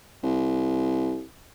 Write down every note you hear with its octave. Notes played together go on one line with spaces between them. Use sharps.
C2